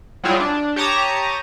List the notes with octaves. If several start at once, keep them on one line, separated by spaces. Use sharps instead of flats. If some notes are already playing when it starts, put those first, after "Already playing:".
F#3 G3 E4 F4 G#4
D4
G4 C#5 A5 A#5 D#6